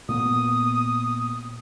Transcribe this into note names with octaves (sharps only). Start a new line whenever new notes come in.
A#2 A#3 B3 D#6